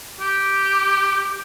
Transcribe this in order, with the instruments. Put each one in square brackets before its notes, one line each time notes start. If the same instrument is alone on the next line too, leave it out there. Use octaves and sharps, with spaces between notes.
[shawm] G4